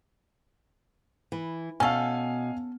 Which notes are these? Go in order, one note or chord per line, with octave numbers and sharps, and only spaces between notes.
E3
B2 C#4 A4 F5 G#5